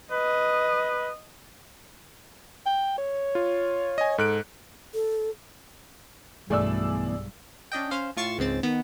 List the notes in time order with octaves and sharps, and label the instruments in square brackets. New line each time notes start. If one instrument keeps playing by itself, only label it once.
[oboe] B4 [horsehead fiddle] D#5
[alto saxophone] G5
C#5
[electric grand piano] F4
D#5 G#5
[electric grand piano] G#2 F#6 D7 [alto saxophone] A4
[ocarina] A4
[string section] B1 G2 [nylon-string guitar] B2 E3 A3 [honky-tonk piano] G#4 D5 E6
[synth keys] C#4 D4 D#5 G5
C#4 C5 F5
A2 F4 C#6 A6 C7 E7
C#2 G#2 C4 A6
D#3 B3